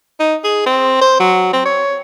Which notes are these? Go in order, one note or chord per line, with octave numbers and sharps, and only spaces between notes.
D#4
G#4
C4
C5
F#3
C4
C#5